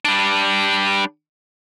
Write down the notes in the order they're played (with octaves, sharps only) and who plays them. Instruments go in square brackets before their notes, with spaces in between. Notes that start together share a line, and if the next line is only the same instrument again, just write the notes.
[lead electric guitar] G3 D4